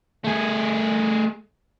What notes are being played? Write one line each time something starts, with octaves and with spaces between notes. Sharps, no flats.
A3 G#4